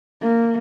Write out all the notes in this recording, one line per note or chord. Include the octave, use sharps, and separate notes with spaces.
A#3